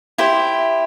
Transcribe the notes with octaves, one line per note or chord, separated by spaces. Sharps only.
E4 G4 C5